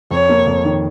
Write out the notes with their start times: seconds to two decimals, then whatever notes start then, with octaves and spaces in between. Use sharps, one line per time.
0.11 F2 C#5
0.29 A#3
0.47 F2
0.65 D#3